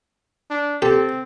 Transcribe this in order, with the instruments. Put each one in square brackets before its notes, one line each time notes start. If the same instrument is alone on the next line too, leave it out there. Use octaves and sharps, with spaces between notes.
[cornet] D4
[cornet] C4 [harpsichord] G4 [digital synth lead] A4